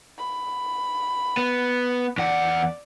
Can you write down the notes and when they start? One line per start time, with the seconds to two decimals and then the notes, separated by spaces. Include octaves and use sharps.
0.18 B5
1.37 B3
2.18 E2 D5 F#5